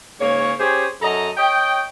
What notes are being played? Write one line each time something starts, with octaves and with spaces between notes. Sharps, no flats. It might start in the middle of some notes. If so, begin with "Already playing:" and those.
G#2 C#3 A#3 C#5
C#4 G4 G#4 C5 C#5
F#2 A4 D#5 A#5
C#5 D#5 G5